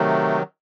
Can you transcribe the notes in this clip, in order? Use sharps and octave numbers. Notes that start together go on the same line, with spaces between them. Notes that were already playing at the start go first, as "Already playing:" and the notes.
Already playing: C3 D#3 F#3 A3